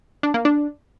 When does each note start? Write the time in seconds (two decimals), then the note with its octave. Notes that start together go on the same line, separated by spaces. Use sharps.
0.23 D4
0.34 A#3
0.45 D4